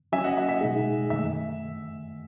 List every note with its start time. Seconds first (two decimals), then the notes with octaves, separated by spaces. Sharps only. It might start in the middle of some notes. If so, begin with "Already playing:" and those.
0.12 F#3 C#4 F#4 E5 G#5
0.24 D#5 F#5
0.37 E5
0.49 E5
0.61 B2 G#3 D#4 G#4
1.10 F#2 D#3 A3 E5